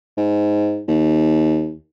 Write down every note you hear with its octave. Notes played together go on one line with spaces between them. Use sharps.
G#2
D#2